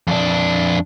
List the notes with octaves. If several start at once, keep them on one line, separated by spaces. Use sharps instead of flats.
F2 D4